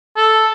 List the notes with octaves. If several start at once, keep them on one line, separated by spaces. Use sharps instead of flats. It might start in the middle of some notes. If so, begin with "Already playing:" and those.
A4